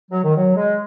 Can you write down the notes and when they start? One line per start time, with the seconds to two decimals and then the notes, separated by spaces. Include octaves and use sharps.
0.12 F#3
0.24 D#3
0.36 F#3
0.55 G#3